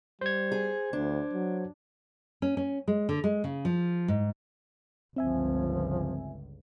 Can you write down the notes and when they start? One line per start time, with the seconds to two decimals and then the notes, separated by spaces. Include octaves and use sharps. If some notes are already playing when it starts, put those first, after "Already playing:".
0.21 G3 C5 G#6
0.52 G#4
0.93 D2 D4
1.33 F#3
2.42 C#4
2.57 C#4
2.88 G#3
3.09 D3
3.24 G#3
3.44 C#3
3.65 F3
4.08 G#2
5.16 G1 C#2 F3 C4 E5 G#5